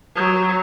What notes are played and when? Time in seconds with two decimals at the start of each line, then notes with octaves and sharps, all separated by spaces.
0.15 F#3